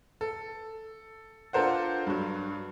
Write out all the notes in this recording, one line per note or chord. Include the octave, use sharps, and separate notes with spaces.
A4
D4 F4 A4 A#4 C5 F#5
G2 F#3